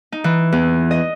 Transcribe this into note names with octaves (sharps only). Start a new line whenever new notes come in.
D#4
E3
E2
D#5